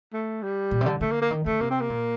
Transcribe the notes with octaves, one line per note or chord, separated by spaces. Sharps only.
A3
G3
A#2
C3
D3
D3 A3
A#3
A#3
D#3
D3 A3
C3 A#3
C4
A#3
A#2